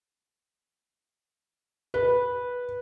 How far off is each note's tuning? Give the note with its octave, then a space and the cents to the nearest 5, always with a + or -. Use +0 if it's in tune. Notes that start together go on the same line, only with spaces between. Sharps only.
B4 -10